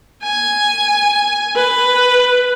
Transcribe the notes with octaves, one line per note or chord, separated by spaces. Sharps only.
G#5
B4